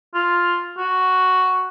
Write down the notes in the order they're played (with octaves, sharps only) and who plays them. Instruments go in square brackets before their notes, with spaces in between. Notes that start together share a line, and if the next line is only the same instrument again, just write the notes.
[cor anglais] F4
F#4